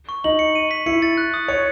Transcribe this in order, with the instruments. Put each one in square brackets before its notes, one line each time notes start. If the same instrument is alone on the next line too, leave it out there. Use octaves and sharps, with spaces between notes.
[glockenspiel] C#6
[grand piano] D#4 [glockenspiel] F#7
[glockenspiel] C#7
D#7
B6
[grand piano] E4 [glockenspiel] C#7
[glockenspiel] A6
F#6
D#6
[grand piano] C#5 [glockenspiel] C#7